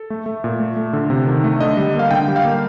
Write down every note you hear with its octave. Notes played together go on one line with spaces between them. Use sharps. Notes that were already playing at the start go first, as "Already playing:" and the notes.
Already playing: A4
A3
A3
A#2
A3
A3
D3
C3
D#3
A3
D3 D#5
G3
A#3 F5
D3 G5
G3
F5
A#3